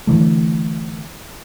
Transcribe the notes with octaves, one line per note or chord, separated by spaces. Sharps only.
D3 E3 A3